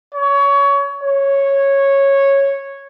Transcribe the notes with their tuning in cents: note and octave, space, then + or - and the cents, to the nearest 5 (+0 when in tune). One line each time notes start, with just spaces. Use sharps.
C#5 +25
C#5 -10